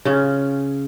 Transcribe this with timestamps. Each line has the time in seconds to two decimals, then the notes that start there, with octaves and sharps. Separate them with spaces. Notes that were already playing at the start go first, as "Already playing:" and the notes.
0.05 C#3 C#4 F4